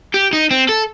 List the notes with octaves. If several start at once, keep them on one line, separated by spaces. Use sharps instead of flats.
G4
D#4
C4
A4